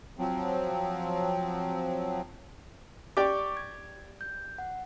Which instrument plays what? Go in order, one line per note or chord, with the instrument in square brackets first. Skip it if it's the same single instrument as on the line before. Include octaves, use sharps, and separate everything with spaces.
[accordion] F3 F#3 C4
[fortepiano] G4 D5 G5 [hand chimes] C#6 D6
[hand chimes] G#6
G6
F#5